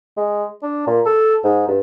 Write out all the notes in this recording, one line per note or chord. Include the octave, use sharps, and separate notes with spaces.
G#3
D4
A#2
A4
G#2
G2